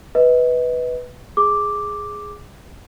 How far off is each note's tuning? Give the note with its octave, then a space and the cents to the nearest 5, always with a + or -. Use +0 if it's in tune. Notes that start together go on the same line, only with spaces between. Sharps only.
B4 +0 D#5 +30
G#4 +0 D6 +0